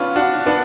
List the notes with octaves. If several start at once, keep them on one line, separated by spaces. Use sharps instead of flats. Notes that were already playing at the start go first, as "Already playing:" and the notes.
Already playing: B3 C#4 D4 F4
D4 F#4
B3 D4